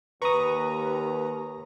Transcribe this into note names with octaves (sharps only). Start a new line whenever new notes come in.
D#2 B4 A#5 C#6 D#6